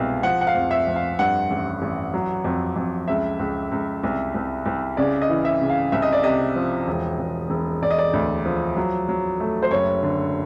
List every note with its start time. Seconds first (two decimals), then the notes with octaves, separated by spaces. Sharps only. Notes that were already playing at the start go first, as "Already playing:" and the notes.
Already playing: C2 B2 G#3 F5
0.23 F3 F#5
0.41 F#5
0.47 F5
0.55 F2
0.71 E5
0.87 F2
0.96 F5
1.19 G2 F#5
1.51 A1
1.82 A1
2.14 F#3
2.44 F2
2.76 F2
3.08 C#2 E5
3.39 C#2
3.72 C#2
4.04 C2
4.34 C2
4.66 C2
4.97 C#3 D5
5.22 D#5
5.29 E3
5.45 E5
5.61 C#3
5.69 F5
5.92 C2 E5
6.02 D#5
6.13 D5
6.24 C3 D#5
6.56 F3
6.88 E1
7.19 E1
7.50 E1
7.82 E1 D5
7.91 D#5
7.98 D5
8.13 D2
8.46 F3
8.76 F#3
9.09 F#3
9.40 A3
9.63 C5
9.71 F#1 C#5
10.03 D3